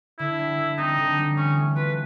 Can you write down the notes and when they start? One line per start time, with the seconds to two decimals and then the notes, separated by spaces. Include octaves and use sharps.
0.19 D3 E4
0.39 G3
0.59 D3
0.78 C4 D#4
0.98 D3
1.18 G3
1.37 E3 C#4
1.57 A3
1.76 F4 B4